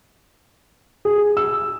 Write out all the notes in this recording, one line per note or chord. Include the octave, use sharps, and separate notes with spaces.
G#4
E6